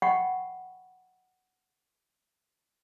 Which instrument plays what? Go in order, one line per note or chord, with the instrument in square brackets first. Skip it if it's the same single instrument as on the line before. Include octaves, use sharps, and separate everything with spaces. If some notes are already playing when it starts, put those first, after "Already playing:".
[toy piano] D#5 F#5 G5 B5 C#6